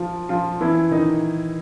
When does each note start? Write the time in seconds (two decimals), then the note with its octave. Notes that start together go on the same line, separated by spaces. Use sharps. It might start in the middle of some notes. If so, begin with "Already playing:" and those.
Already playing: F3 F4
0.29 F3 F4
0.61 E3 E4
0.91 D#3 D#4